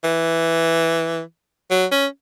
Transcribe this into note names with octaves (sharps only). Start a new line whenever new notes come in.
E3
F#3
C#4